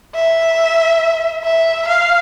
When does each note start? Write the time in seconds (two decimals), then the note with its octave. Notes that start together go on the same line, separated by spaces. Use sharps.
0.15 E5
1.44 E5
1.88 F5